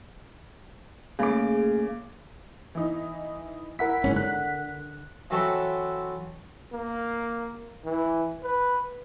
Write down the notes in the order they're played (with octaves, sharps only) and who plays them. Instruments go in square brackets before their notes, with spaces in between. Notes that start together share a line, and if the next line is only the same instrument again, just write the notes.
[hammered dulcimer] C#3 D6 [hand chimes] A3 A#3 G#4
[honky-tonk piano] E3 D#4
[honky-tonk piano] E4 [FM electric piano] A#4 F#5 B6
[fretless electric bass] F#1 G#2 C#4
[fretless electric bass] D3 [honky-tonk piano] F#6
[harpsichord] E3 F#3 C4 A4 C#5 E5
[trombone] A#3
E3
B4